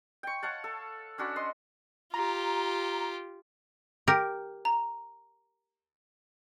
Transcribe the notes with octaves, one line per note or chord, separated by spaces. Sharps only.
G5 C#6
C#5 F5 F#5 A5
A4
C#4 D4 F#4 B5
D#5 C6
F4 G4 A#5
G4 A#4
A#5